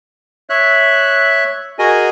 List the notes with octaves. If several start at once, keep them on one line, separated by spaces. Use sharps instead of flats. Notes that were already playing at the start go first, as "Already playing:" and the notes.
C#5 E5 F#6
F#4 G#4 A#4 D#5 G#5